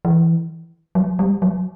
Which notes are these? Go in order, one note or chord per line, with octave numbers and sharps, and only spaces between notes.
E3
F#3
G3
F#3